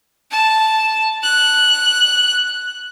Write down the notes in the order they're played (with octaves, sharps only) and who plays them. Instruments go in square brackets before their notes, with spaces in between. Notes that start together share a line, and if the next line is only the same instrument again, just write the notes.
[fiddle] A5
F#6